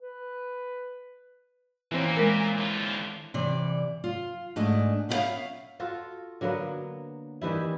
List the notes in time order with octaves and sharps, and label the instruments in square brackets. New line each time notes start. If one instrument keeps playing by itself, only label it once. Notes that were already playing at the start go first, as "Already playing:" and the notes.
[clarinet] B4
[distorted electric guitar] A#2 A#3 [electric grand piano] E3 C4 C#4
[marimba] G#3 A#4
[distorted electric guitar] D3 F4
[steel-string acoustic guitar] C3 E3 D5
F4
G#2 A3 D4 D#5 G#5
B3 C#4 E4 D5 E5 F5
[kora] F4 F#4 A4
D3 F#3 A#3 B3
D#3 E3 G3 E4